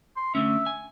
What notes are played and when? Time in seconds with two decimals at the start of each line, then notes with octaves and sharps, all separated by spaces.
0.17 C6
0.35 D3 A3 C#4 E5
0.66 G#5